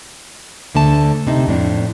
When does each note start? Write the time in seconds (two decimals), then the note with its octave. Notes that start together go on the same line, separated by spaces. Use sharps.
0.75 D2 D3 A3 A5
1.27 C3 D#4
1.47 F2 A2 D4